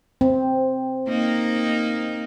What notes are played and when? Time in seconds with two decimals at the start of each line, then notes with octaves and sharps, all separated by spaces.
0.21 C4
1.09 A#3 D#4